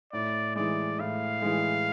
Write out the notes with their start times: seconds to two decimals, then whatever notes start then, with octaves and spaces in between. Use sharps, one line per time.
0.12 A2 D5
0.55 E3 G#3 D5
0.99 A2 F5
1.42 E3 G#3